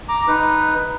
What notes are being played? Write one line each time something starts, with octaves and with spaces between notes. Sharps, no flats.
A#5 D6
D#4 B4